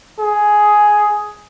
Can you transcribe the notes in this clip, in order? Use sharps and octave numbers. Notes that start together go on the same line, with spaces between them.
G#4